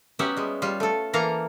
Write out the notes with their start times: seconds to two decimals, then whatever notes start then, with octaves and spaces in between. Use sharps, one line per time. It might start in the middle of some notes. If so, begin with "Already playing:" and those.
0.19 F#3 B3 C#4 G4 E5 F#5
0.37 G3 G#3
0.62 G3 F4
0.80 A3 A4
1.13 E3 A#3 A4 F5 A#5